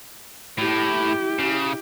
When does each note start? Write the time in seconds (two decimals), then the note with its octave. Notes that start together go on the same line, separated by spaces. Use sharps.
0.58 A2 E4 G4
1.39 C#3